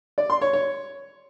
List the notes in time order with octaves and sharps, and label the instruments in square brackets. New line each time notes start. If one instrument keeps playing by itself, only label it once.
[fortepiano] D5
C6
C#5
C#5